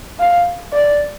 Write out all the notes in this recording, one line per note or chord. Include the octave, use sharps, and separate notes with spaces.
F5
D5